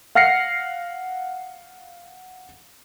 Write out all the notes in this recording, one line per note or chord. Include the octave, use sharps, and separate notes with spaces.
F5 F#5 F6 A#6 C7 C#7